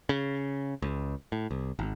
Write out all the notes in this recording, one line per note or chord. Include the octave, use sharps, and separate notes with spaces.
C#3
C#2
A2
C2
G#1